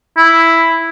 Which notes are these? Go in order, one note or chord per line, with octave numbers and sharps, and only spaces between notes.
E4